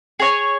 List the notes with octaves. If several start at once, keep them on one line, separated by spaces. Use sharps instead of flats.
G#4 C#5 G#5